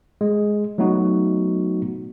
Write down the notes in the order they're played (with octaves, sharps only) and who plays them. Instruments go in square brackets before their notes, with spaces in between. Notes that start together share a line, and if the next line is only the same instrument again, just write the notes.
[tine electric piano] G#3
F#3 A3 B3 D#4 F#4